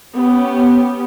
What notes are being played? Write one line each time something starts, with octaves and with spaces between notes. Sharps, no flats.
B3 C#4 G4